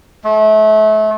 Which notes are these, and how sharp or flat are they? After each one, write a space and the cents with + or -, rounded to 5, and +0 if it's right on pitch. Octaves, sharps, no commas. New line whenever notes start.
A3 -30